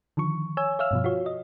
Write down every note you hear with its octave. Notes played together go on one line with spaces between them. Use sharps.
D3 D#3 F3 C#6
C#5 G#5 E6
C#5 E5 F5 E6 F6
G2 B2 F3
F4 F#4 C#5
D#5